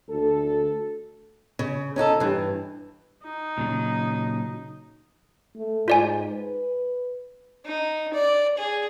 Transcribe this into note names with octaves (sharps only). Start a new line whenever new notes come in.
D2 A4
C#3
C#4 D#4 F#4 A4
G2 E3
D#4
A#2 C#3 F#3
A3
G#2 F4 D5 G#5
B4
D#4
D5
G#4